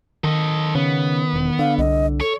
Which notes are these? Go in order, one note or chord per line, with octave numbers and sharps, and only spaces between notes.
D#3 A4 D#5
C#3 B3
E1
D3 F5
C2 D#5
A4 C#5